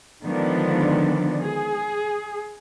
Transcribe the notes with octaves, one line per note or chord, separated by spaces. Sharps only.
D3 D#3 F3 G#3 B3 D4
G#4